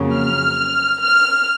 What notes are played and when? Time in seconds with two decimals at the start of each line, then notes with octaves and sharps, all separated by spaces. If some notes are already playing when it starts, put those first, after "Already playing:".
Already playing: F2 C#3 F#3 A#3
0.15 F6
1.02 F6